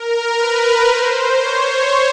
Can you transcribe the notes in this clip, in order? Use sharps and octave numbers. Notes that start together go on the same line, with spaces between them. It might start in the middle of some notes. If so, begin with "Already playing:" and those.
Already playing: A#4
B4
C5
C#5